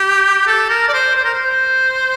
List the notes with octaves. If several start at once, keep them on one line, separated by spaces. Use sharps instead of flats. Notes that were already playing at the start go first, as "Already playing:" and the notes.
Already playing: G4
A4
A#4
D5
C5
C5
A#4
C5